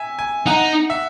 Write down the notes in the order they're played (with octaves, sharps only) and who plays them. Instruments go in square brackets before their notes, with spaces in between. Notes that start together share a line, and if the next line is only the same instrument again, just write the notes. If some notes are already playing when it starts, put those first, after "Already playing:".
Already playing: [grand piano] E5 G#5
G#5
[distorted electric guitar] D#4 [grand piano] F#5
[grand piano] E5